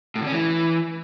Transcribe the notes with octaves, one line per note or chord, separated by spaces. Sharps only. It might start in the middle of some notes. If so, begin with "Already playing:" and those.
A2
D3
C#4
E3